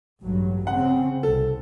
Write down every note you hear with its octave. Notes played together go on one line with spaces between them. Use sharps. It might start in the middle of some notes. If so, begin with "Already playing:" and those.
A1 G2 F#3
C#3 C4 F#5
C2 A4